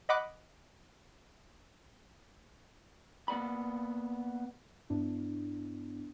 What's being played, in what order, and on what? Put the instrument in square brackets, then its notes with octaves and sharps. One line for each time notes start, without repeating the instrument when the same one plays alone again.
[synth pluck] D#5 F#5 B5 D6 F#6
[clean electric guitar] A#3 B3 D5 B5
[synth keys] G2 B3 D4 E4